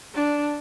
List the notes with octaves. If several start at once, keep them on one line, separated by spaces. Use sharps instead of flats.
D4